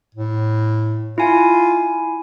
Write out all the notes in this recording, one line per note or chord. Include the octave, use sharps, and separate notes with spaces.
A2
E4 F4 G#5